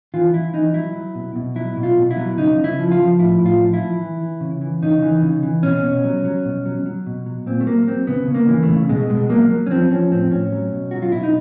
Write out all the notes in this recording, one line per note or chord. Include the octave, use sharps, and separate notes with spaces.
E3 F4
E3 E4
E3 D#4
F#3 E4
F#3
B2
B2
F#3 E4
B2
F4
B2
E4
F#3
C#3 D#4
C#3
E4
F3
F4
F3
A2 E4
A2
F4
F3
E4
F3
E3
E3
C#3
E3
C#3 D#4
E3
C#3
E3
B2 C#4
B2
F#3
F#3
B2
F#3
F#3
B2
F#3
A#2 C4
A3
F#3 A#3
F#3 C4
C#3 B3
C#3
A#3
E3
A3
C#3
B2 G#3
B2 G#3
F#3 A#3
F#3
C#4
F3 C4
F3 C#4
A2 C4
A2 C#4
F#3
B2
F#3 F#4
F4
B2 E4
D#4